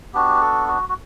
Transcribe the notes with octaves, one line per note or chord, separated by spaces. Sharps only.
B3 D4 F#4 G4
A4
F#4
F#4